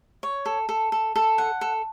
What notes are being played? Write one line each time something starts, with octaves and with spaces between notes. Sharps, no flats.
C#5
A4
A4
A4
A4
F#5
A4